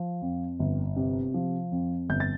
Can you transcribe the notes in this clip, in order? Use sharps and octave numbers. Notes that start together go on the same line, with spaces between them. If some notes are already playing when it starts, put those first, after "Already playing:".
Already playing: F3
F2
G1
C3
F3
F2
G1 G6
A6